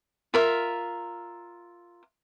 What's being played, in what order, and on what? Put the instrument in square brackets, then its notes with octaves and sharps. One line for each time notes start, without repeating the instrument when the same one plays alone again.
[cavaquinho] F4 A#4 E5